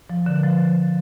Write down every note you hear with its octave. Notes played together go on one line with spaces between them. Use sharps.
F3
D3
F3